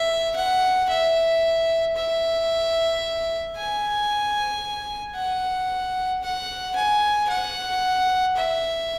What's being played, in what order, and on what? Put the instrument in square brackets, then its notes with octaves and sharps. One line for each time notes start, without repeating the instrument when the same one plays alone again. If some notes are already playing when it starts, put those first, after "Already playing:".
Already playing: [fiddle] E5
F#5
E5
E5
G#5
F#5
F#5
G#5
F#5
E5